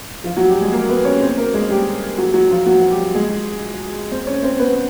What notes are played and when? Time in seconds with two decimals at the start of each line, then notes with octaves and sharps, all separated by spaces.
0.24 F3 F4
0.36 F#3 F#4
0.48 G3 G4
0.61 G#3 G#4
0.72 A#3 A#4
0.89 B3 B4
1.05 C#4 C#5
1.21 C4 C5
1.37 A#3 A#4
1.54 G#3 G#4
1.69 G3 G4
2.18 F#3 F#4
2.34 F#3 F#4
2.50 F3 F4
2.66 F#3 F#4
2.80 F#4
2.90 G3 G4
3.14 G#3 G#4
4.11 C4 C5
4.27 C#4 C#5
4.43 C4 C5
4.59 B3 B4